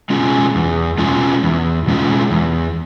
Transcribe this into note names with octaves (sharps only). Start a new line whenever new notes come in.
B2 G#3 C#4 F4
E2
B2 G#3 C#4 F4
E2
B2 G#3 C#4 F4
E2